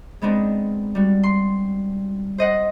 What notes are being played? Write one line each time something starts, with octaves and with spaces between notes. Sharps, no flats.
G#3 B3 C4 D4 D#4
G3 F#4
C6
C5 D#5 F#5